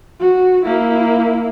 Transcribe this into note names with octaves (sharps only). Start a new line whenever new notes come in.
F#4
A#3 E4